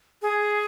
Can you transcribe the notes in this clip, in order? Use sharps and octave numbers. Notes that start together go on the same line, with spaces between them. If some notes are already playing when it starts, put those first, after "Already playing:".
G#4